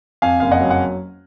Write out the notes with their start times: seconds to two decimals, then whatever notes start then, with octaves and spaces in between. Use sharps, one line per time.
0.22 F2 F5 G#5
0.40 F#1 F5
0.51 D#5 F#5
0.61 F#3
0.71 F#5